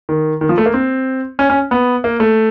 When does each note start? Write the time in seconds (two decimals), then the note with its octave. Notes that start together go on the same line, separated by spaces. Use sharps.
0.09 D#3
0.41 D#3
0.49 F3
0.58 A3
0.66 A#3
0.74 C4
1.39 C#4
1.50 C#4
1.71 B3
2.04 A#3
2.20 A3